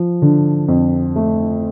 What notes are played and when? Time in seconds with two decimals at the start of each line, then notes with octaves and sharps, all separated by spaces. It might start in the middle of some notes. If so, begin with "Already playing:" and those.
Already playing: F3
0.22 D3
0.68 F2
1.16 A3